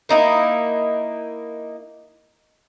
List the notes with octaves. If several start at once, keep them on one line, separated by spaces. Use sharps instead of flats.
A#3 D#4 E4